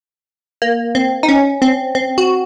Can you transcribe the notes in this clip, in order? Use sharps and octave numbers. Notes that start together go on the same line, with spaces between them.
A#3
C4
D#4
C#4
C4
C4
F#4